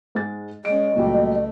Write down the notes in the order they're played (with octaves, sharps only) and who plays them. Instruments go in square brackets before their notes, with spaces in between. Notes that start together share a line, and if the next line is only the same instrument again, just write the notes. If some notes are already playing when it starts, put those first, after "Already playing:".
[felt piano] G#2 G#3 A6
[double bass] G#3 C#4 [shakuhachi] D#5 [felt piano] D7
[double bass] C#2 A3 [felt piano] A#2 F#3 G3